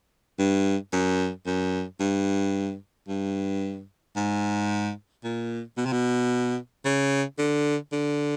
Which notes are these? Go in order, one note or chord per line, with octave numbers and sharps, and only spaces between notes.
G2
F#2
F#2
G2
G2
G#2
A#2
B2
C3
B2
C#3
D3
D3